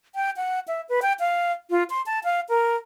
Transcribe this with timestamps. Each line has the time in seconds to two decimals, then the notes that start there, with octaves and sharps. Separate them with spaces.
0.15 G5
0.37 F#5
0.68 E5
0.89 B4
1.02 G5
1.20 F5
1.70 F4
1.90 C6
2.06 A5
2.24 F5
2.49 A#4